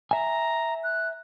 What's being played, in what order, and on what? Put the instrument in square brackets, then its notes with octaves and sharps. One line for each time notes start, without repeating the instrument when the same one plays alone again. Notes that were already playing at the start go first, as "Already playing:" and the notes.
[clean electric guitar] E5 G#5 [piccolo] A#5
[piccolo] F#6